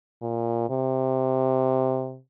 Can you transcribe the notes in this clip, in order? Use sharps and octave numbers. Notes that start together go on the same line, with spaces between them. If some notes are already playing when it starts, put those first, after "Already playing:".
A#2
C3